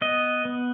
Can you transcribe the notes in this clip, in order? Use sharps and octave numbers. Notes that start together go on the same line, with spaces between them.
B3 D#5
B3